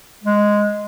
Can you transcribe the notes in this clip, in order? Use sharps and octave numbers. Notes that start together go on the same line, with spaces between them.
G#3